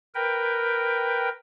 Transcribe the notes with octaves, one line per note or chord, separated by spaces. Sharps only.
A#4 B4 G5